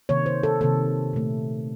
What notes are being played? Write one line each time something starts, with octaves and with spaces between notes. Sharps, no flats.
C3 D#3 A#3 C#5
C5
A4
C3 D#3 A#3 A4
A#2 A3